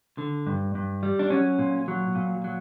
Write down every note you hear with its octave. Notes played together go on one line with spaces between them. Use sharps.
D3
G2
G2
G3
D4
F#3 C#4
A#2
F#3
A#2
F#3